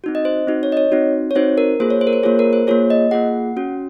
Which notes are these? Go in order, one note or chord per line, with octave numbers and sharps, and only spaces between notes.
C4 D#4 F#4
D#5
C5
C4 D#4 F#4
C#5
D#5
C#5
C4 D#4 F#4
C#5
C4 D#4 F#4 C5
A#4
A#3 F4 G#4 C5
C#5
C5
A#4
C5
A#3 F4 G#4 C#5
A#4
C5
A#3 F4 G#4 C#5
D#5
A#3 F4 G#4 F#5
C#4 F#4